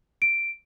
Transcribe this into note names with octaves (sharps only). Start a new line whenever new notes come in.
D7